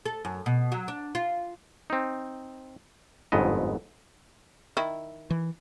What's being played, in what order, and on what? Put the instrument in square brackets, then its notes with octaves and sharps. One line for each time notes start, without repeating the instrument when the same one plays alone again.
[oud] A4
F#2
B2
F#3
D4
F4
[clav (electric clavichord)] C4 D#4
G1 F2 G#2 B3 D#5
[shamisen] D#3 E4
[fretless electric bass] E3